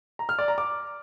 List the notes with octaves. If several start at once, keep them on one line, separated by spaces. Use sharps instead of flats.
A#5
F6
D5
A#5
D6